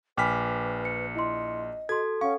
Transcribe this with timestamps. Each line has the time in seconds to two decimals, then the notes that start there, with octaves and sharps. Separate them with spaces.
0.17 A#1 B4 G5 G#5 B5 D6 F6 B6
0.85 C#7
1.15 E4 D#5 C6
1.89 F#4 A4 C6 G#6
2.21 C#4 F5 F#5 C#6